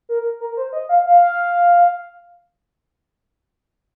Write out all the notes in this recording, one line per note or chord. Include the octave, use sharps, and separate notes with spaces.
A#4
A#4
C5
D#5
F5
F5